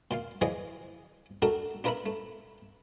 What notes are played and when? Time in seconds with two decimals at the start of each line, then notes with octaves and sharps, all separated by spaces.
0.11 A#2 F4 F5
0.41 E3 F3 G#4 D5 D#5
1.42 A3 D4 F#4 A4 A#4
1.84 D4 F4 A#4 B4 E5 B5
2.06 A3